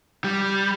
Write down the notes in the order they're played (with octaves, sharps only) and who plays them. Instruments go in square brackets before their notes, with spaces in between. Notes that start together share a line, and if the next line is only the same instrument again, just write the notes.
[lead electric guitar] G3